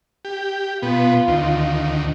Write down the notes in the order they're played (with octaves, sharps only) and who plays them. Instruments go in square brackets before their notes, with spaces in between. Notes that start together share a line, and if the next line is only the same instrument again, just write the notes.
[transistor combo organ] G4
[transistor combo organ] B2 B3 [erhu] F4
[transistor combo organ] D2 D#3